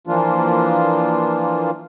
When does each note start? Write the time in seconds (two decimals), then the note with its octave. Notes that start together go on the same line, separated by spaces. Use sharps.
0.07 E3 F3 A#3 D4 F4